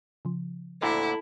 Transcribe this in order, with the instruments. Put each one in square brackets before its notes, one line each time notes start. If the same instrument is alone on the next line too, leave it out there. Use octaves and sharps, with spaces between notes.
[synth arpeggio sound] C#3 F3
[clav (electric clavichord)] D2 A#2 D3 [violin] E4 [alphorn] A4